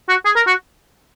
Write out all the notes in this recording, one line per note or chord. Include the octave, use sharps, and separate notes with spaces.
F#4
G#4
A#4
F#4